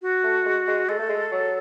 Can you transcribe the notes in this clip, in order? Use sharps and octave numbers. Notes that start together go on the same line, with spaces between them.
F#4
A3
G#3
G#3
G#3 A4
A3
G#3
F#3